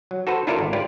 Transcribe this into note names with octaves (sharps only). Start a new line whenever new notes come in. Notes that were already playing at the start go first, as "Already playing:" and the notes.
F#3
F#4 A4 B4 C5
D4 E4 F4 A4 A#4 D5
G#1
F4 G4 B4 D5